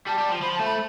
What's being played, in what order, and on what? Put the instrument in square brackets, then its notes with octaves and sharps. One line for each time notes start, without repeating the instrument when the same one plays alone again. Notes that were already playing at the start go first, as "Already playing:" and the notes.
[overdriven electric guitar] G3 [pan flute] A5
[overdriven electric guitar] G3
F3
[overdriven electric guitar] F3 [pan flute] B5
[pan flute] A5
[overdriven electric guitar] A3
[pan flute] B5